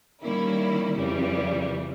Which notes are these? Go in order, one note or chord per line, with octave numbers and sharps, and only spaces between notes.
D#3 G3 A#3 C#4 E4
F2 C#3 E3 G3